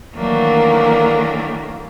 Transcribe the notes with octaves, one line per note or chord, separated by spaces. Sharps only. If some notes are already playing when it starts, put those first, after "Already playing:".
D#3 E3 F#3 A3 A#3 D4